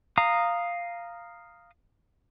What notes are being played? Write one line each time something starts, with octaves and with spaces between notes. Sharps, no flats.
F5 A#5 D#6